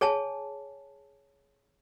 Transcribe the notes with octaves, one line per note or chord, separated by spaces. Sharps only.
G#4 C#5 G#5 A5